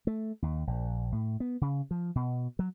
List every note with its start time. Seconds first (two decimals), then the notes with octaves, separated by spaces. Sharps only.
0.07 A3
0.42 D#2
0.67 A#1
1.12 A2
1.40 B3
1.61 C#3
1.91 F3
2.15 B2
2.59 F#3